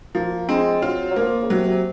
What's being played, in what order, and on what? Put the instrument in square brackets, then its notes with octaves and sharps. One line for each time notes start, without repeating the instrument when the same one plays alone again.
[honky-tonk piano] F3 [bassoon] A#3
[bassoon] G#3 [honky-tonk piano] C4
[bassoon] F#3 [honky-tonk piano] F4
[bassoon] F#3
[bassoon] F3 [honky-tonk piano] A#3
[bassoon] C#3
[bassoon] C3 [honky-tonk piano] F#3
[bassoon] C3